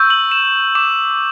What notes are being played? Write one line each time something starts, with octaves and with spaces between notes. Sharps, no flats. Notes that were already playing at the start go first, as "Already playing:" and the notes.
Already playing: C#6 E6 G6
F#7
E7
D6 E7